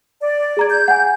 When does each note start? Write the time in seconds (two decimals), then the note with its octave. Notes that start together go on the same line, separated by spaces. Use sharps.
0.22 D5
0.57 G#4 A#5 G#6
0.70 G6
0.88 F#5 G#5